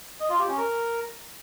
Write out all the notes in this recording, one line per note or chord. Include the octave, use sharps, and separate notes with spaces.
D#5
F4
G4
C#4
A#4